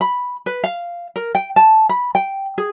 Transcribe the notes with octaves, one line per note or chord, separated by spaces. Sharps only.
B5
B4
F5
A#4
G5
A5
B5
G5
G#4